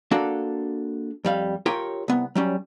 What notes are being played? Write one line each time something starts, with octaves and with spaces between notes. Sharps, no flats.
A#3 D4 F#4 A4 F5
F2 G3 F5
F4 G4 A#4 C#5 G5
C2 B3
F#3 G3 C#4